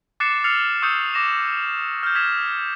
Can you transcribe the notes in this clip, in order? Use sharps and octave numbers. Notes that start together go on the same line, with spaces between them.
D6 F#6 A6 C7 C#7 E7
E6 F6 A6 C7 C#7 F7
C#6 D#6 E6 G6 C#7
D6 A#6 E7
F6 G6
D#6 G#6 B6 E7